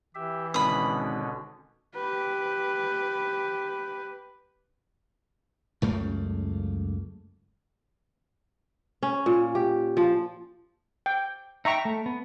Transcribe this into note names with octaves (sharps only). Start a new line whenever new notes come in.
E3 G4 E5
G#1 B2 D3 C#4 B5 D#6
G4 B4
C#2 F#2 A3 A#3
C#4
A#2
G4
F3
G5
D#4 E5 G5 A#5 C#6
A3
B3